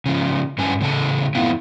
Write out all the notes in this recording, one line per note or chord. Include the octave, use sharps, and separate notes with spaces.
C#3 F3
G2 F#3 C#4 B4 G#5 A5
A2 C#3 A4 A5
F2 A3 B3 E4 F4